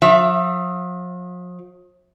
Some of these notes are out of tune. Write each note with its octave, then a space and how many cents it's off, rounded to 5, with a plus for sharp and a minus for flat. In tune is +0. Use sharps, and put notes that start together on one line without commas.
F3 +45 E5 +25